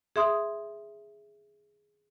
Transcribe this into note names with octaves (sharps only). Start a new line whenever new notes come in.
G#4 E5 C6 D#6